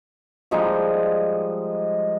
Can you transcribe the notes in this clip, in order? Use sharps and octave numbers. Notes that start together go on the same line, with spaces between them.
F3 G3 G#3 D#4